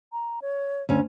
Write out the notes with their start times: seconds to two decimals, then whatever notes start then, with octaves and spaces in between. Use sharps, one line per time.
0.12 A#5
0.42 C#5
0.89 D2 C#4